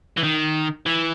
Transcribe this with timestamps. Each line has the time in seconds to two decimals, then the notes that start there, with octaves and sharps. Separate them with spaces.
0.18 E3
0.24 D#3
0.86 E3